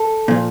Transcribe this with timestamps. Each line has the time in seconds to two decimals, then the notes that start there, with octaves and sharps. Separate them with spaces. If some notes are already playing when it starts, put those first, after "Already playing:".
Already playing: A4
0.28 A#2 F3